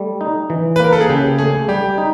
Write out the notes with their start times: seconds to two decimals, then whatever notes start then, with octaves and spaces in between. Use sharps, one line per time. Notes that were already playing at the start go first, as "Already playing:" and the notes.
Already playing: G3 A3
0.21 D#4
0.50 E3
0.76 B4
0.79 A#3 A#4
0.93 A4
1.01 G#4
1.09 C#3 G4
1.38 A3 G#4
1.68 G3 G4
1.98 D#4